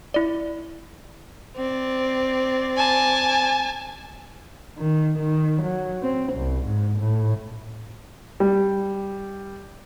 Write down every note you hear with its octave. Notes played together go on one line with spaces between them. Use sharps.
E4 D5
C4 D5
G#5 A5
D#3
D#3
F#3
C4
C2
G#2
A2
G3